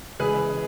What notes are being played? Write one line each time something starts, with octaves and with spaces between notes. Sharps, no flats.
C#3 E3 G#3 G#4 B4